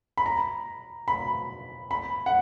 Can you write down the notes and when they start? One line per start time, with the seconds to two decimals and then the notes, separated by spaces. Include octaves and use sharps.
0.17 B5
0.26 A#5
1.08 B5
1.91 B5
2.26 F#5